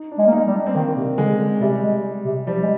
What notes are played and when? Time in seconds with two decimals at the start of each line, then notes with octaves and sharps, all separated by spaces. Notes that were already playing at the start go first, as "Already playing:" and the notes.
Already playing: D#4
0.12 D4
0.18 G#3
0.26 A#3
0.32 G#3 D#4
0.47 G3
0.54 D4
0.66 C4
0.75 D#3 A#3
0.96 C3
1.18 D3 G#3
1.61 C3 G3
1.83 G#3
2.25 C3
2.47 F3 G3
2.62 G#3